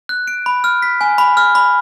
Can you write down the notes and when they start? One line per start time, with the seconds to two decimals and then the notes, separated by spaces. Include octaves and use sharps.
0.09 F#6
0.28 D7
0.46 B5
0.64 F6
0.82 B6
1.01 G#5
1.18 B5
1.37 F6
1.55 B5